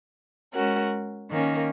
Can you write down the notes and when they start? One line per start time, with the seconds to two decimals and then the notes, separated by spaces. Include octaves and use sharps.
0.53 G#3 C#4 F#4 A#4
1.31 D#3 A#3 C#4